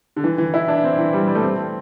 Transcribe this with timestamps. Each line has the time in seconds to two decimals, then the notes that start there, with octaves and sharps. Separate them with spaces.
0.16 D3
0.24 E3
0.38 E3
0.54 E4
0.68 D4
0.84 C4
0.98 E3
1.13 G3
1.28 G3
1.35 A3
1.42 C4